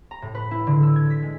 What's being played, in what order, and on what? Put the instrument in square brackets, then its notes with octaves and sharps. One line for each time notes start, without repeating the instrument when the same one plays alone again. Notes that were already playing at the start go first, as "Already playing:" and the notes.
[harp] A#5
A2
B4
E4
D3
E6
G#6
B6
G#3